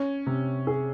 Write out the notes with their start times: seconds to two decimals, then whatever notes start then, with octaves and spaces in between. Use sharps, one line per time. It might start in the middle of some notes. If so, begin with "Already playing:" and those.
Already playing: C#4
0.26 C3
0.67 G#4